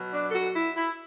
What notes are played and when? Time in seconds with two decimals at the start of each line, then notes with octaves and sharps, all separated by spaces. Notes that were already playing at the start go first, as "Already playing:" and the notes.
Already playing: B2 F#3
0.12 D4
0.30 A4
0.33 F#4
0.55 E4
0.76 E4